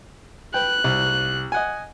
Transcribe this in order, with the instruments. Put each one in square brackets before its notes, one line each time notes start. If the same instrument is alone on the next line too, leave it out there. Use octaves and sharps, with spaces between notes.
[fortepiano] B4 G5 [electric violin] F#6
[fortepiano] C2
D#5 F#5 G#5